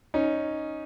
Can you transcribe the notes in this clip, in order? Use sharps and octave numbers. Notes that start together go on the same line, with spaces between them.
C#4 D#4